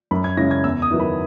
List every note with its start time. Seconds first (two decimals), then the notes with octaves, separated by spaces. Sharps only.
0.11 F#2 B5
0.24 G#6
0.37 C#3 G#3 C#4 E4 A#6
0.51 G#6
0.64 E2 E6
0.82 D#6
0.91 D#3 F#3 B3 E4
1.00 B5